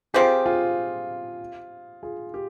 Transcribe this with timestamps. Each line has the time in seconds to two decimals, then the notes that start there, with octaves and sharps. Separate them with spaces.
0.14 F3 C4 F4 G4 G#4
0.46 F4 G#4
2.03 F4 G#4
2.34 G4